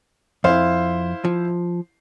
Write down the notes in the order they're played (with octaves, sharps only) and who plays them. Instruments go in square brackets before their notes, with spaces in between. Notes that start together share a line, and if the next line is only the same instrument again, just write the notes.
[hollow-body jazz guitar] F2 [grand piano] E4 C5 F5
[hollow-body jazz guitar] F3